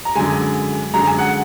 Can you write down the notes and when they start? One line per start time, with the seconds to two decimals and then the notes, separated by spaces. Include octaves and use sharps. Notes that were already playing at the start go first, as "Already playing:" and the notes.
0.05 A#5
0.15 F#2 D3 G#3 G#5
0.94 F#2 D3 G#3 A#5
1.06 G#5
1.19 F#5